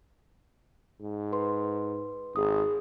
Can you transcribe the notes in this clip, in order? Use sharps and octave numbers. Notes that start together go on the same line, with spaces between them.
G#2
B4 C6
G#1 G#4 D#6